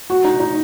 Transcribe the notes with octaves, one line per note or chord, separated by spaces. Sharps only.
F#4
D#4
D#4